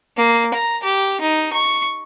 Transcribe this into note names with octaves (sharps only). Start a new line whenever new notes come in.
A#3
A#5
G4
D#4
C#6